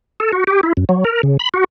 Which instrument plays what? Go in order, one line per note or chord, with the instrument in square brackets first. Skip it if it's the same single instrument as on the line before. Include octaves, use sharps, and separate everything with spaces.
[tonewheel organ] A4
F#4
G4
E4
F#2
F#3
A#4
C#3
B5
F#4